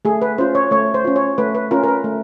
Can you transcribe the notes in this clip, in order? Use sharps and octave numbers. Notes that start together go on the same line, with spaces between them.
A3 G#4
B4
C#4 F4 C5
C#5
A3 C#5
C5
C#4 F4
C#5
A3 B4
B4
C#4 F4 A#4
A#4
B4
A3